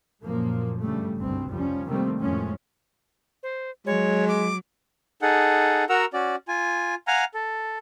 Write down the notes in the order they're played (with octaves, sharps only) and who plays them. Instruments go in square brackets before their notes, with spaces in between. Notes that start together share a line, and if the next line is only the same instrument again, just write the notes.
[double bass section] F#2 A#2 F3 A#3
G2 C#3 G3 A3
G1 C2 G2 B2 C4
F1 F3 G3 C#4
C3 D#3 G3 A3 A#3 C4
F2 A2 F3 G#3 A3 C#4
[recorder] C5
[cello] F#3 [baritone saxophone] G#3 [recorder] C#5
[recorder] D6
[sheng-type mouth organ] D#4 G#4 A4 F#5
F#4 A#4 F#5 A#5 E6
C#4 F#4 D5
F4 G#5
F5 F#5 G#5 A#5 F6
A4